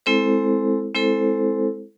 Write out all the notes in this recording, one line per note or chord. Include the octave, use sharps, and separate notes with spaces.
G#3 C4 E4 A4 C5
G#3 C4 E4 A4 C5